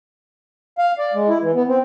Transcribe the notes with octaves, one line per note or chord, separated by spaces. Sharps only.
F5
D5
G#3
E4
E3
B3
C4